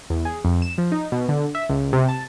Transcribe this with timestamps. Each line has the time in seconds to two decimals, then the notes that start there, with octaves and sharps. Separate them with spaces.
0.10 E2
0.25 G#4
0.45 F2
0.62 E7
0.78 F3
0.92 D#4
1.12 B2
1.29 D3
1.55 E5
1.69 C#2
1.93 C3
2.09 A5